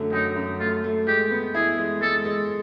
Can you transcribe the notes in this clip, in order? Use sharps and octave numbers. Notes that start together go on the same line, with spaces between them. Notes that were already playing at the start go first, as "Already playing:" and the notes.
Already playing: F#2 D3 A3
F#2 D#4
F#2
A3 F4
A3
G#3 G4
B3
E4 G#4
G#3
G#3 A4
G#3